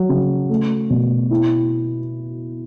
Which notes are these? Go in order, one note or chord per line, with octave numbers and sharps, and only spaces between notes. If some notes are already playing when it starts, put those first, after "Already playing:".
Already playing: F#3
C#3
A3
B2
E4